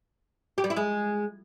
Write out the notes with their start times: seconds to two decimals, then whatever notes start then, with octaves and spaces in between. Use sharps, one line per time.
0.58 G4
0.64 G3
0.70 E4
0.76 G#3